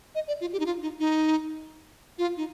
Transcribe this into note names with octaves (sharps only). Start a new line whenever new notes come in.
D#5
D5
F4
G4
D#4
F4
D#4
D#4
F4
D#4